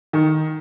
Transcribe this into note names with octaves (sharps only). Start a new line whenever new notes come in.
D#3